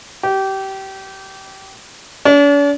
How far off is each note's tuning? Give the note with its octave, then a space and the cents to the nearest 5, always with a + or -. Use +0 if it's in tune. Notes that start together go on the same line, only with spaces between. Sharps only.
G4 -25
D4 -45